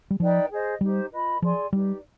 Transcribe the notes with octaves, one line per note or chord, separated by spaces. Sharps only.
G3
F3 D#4 B4 D5 G5
G#4 C5 D#5
G3 D#4 G4 C5
F4 B4 D#5 B5
F3 G#4 D5 G#5 C6
G3 D#4 G4 B4 D5